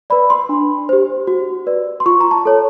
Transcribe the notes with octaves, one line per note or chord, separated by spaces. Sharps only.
B4 D5 B5
C6
D4
G4 C5
F#4
B4 D5
C6
F4 C#6
A#5
A5
A4 C#5